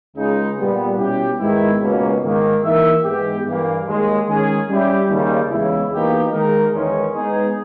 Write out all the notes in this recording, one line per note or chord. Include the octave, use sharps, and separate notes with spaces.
C#2 C#3 G#3 D#4
A#2 G3 B3
B2 G3 C#4 E4 G4
G#2 D#3 G#3 B3 E4
C#2 B2 A#3 C#4
G#2 D#3 A#3
E3 A#3 D#4 A#4 E5
G#2 E3 G#3 B3 G4
G2 E3 A#3
D#2 D#3 G#3
D#3 G#3 C#4 G#4
G3 C#4 E4 G4
D#2 C#3 G3
E2 C#3 G#3 B3 E4
E2 B2 A#3 D#4 G4
D#3 G#3 D#4 A#4
E2 D#3 G#3 C#4
G#3 B3 D#4 G#4